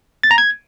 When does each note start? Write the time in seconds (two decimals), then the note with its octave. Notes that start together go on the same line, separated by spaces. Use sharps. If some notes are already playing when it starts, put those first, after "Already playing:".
0.23 A6
0.31 A#5
0.38 G#6